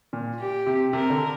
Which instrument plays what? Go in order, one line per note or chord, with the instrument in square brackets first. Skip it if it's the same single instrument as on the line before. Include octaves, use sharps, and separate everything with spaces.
[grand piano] A#2
[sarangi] G4
[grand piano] C3
[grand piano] C3 [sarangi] A#4
[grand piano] D3